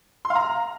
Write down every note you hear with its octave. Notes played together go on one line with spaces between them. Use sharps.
C6
F5
A#5